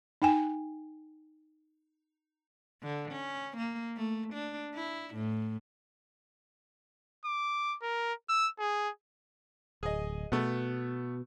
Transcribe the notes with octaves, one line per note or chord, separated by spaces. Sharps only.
D#4 G5 G#5
D3
C#4
A#3
A3
D4
E4
A2
D6
A#4
E6
G#4
D1 G#4 D#5
B2 A3 B3